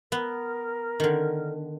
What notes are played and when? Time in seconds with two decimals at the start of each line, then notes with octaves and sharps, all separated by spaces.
0.12 B3 A#4
1.00 D3 D#3